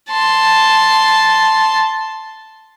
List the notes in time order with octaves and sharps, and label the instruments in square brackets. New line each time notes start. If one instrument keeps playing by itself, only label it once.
[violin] A5 C6